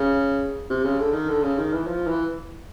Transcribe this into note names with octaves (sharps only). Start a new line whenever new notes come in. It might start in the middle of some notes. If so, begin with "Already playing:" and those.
Already playing: C#3
C3
C#3
D3
D#3
D3
C#3
D#3
E3
F3
E3